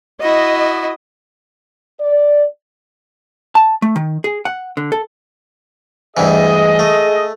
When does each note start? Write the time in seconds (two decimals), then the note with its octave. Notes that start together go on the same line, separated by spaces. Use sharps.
0.21 E4 F#4 D#5
1.99 D5
3.55 A5
3.82 A3
3.96 D#3
4.24 G#4
4.45 F#5
4.77 D3
4.92 A4
6.17 D2 G2 E3 G#4 D#5
6.79 A3